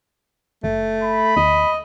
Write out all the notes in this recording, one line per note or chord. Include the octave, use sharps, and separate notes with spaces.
F#1 A3
B5
D2 D#5